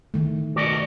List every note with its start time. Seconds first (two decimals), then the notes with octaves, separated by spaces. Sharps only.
0.14 D#3 A3
0.56 F#4 D5 D#5